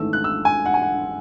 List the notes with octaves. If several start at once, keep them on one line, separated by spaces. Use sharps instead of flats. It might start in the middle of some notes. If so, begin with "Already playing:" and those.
Already playing: G#1 G#2 E3 A3 C#4 E6
F#6
E6
G#5
F#5
G#5
F#5